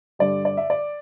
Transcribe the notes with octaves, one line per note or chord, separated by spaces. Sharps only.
G2 D3 G3 D5
D5
E5
D5